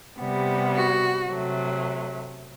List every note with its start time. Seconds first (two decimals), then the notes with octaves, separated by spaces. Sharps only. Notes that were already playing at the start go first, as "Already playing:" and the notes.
0.19 C3 G3 B3
0.74 F#4
1.28 C3 F#3 A3